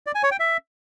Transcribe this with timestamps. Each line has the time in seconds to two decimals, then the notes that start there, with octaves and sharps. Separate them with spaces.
0.07 D5
0.15 G#5
0.23 C#5
0.31 G5
0.40 E5